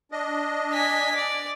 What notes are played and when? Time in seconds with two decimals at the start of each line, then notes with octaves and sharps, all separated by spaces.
0.12 D4 D#5
0.73 G#5 B6
1.15 D5